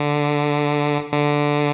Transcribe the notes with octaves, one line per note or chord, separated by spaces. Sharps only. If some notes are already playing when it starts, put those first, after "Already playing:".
Already playing: D3
D3